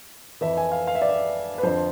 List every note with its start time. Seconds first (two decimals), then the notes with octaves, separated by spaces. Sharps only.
0.41 F2 E3 E5
0.57 G#5
0.72 F5
0.87 F5
0.95 E5
1.02 D5
1.09 E5
1.58 B4
1.63 F2 D3 F3 C5